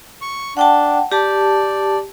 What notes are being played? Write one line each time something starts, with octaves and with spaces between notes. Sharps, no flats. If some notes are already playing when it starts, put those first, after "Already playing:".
C#6
D4 F#5 G5 A5
G4 D5 A5